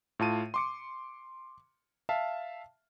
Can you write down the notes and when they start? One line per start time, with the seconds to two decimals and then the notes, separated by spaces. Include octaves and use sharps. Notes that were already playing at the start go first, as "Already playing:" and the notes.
0.19 A2 F4 A5 D#7
0.54 C6 D6 C#7
2.09 E5 F5 A5